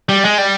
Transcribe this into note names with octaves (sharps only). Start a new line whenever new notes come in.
G3
G#3
G3